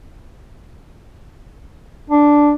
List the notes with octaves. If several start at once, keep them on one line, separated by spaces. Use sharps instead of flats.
D4